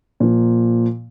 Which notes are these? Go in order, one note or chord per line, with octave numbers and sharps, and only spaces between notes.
A#2 F3